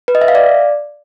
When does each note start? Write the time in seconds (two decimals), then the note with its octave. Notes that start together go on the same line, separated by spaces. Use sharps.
0.08 B4
0.15 D#5
0.22 E5
0.28 F5
0.35 D5